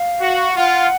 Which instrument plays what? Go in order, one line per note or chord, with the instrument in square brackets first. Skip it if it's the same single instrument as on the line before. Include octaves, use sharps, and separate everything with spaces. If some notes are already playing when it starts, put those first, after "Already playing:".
Already playing: [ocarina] F5
[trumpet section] F#4
[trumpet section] F4 [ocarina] F#5